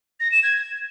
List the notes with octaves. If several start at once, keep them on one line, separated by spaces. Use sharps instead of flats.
A#6
E7
G#6